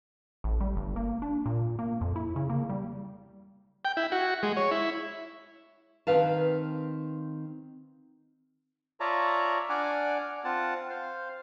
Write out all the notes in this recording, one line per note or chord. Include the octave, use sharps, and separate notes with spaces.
A1
G3
G1
A#3
D4
A#2
A#3
F2
E4
C#3
A#3
G3
G5
E4
F#4
G#3
C#5
E4
D#3 C4 B4 F5 A5
F4 C#5 D5 E5 A5 A#5
D4 D5 F#5 G#5 D6 F6
C4 F4 F#5 A5
C5 F5